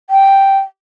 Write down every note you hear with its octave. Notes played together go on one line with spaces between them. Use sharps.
G5